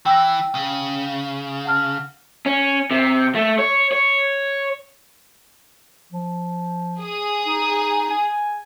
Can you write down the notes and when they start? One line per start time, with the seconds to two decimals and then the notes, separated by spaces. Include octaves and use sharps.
0.06 E3 G5 E6 A#6
0.55 C#3
1.65 F#5 A5 F6
2.46 C#4
2.91 C3
3.35 A3
3.59 C#5
3.92 C#5
6.12 F3
7.00 G#4 D#6
7.47 D#4
8.11 G#5